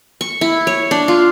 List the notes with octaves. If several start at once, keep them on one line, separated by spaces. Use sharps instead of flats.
C#6
E4
C#5
D4
F4